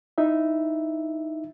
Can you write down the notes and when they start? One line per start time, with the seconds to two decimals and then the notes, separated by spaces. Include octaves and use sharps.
0.18 D#4 E4 E5